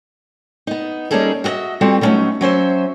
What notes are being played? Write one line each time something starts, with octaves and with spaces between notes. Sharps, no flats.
B3 D#4
G3 A#3 C#4 D#4 G#4 A4
F#4 G4 C#5 D#5 E5
G3 B3 C4 F4 F#4 A4
D3 F#3 A3 B3 C#4 D#4
F#3 C#4 C5 E5